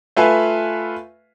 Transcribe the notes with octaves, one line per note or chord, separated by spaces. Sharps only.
A3 F4 B4 E5 F5 G#5